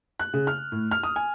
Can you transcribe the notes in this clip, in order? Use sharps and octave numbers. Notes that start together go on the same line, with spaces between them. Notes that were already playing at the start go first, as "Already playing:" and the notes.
F#6
C#3
F6
A2
F6
D#6
G#5